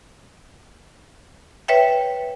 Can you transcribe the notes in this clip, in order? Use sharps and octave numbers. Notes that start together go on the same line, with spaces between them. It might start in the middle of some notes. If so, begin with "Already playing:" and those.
B4 C#5 E5 G5